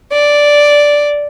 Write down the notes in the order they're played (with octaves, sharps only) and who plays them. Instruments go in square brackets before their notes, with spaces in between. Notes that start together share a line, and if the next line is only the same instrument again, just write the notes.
[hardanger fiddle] D5